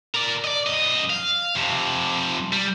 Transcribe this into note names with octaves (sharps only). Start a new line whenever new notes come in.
A#4 D5
D5 D#5
F#2 D#5
F5
F2 C3
G3